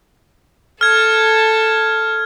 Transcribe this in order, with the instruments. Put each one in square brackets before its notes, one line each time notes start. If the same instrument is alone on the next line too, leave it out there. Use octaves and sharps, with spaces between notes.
[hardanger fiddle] A4 A5 [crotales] F6 G#6